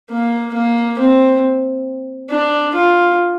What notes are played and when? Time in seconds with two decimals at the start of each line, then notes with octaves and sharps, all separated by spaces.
0.10 A#3
0.54 A#3
0.98 C4
2.30 D4
2.74 F4